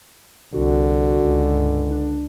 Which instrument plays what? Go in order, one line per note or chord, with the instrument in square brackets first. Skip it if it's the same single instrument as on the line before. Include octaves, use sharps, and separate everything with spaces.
[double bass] C2 [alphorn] D3 [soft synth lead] F#4
[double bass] C#2
[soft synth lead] G2
D4